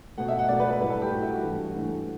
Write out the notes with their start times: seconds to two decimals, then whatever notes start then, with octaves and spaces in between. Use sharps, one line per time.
0.17 B2 A3 F#5
0.28 E5
0.39 F#5
0.48 B2 A3 D5
0.60 B4
0.70 B4
0.80 A2 G3 B4
0.90 A4
1.02 G4
1.12 A2 G3 F#4
1.22 E4
1.32 F#4
1.43 G2 E3 A3
1.74 G2 E3 A3